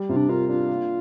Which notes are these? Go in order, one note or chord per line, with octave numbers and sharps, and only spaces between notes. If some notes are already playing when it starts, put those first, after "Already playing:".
Already playing: G3
C3 F4
D4
F4 A#4
D4 F4
A#3